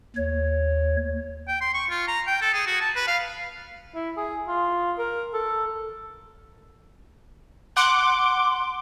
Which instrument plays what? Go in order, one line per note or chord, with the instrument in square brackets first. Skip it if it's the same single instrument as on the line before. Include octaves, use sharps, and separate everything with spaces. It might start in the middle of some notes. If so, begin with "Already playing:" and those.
[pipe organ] D#2 C#5
[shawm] G5
C6
C#6
F4
A#5
G5
A4
G#4
F#4
A5
B4
F5
[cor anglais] E4
G#4
F4
A#4
A4
[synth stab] F#5 [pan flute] C6 [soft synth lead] D6